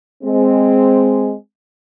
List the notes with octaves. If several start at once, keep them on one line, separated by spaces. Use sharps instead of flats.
G#3 C4